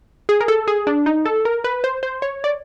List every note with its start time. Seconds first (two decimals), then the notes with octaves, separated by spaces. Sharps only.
0.29 G#4
0.41 A#4
0.48 A4
0.68 G#4
0.87 D4
1.06 D#4
1.25 A4
1.45 A#4
1.64 B4
1.84 C5
2.03 C5
2.22 C#5
2.44 D5